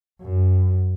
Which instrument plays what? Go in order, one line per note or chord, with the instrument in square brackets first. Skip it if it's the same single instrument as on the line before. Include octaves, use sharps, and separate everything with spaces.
[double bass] F#2